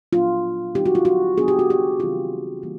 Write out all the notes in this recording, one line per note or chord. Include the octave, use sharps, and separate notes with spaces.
A#2 F#3 B3 D4 F4
D#3 G3 C4 D#4 G4
F#4
F4
F#4
C#3 F#3 B3 D4 G#4
G4
F#4
G4
C#3 E3 G3 C4 F4
E3 G3 A#3